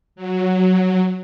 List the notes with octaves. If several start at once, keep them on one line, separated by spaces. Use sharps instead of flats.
F#3